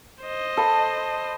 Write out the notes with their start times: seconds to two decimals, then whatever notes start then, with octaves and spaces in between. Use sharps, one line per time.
0.23 C5 D#5
0.57 A4 B5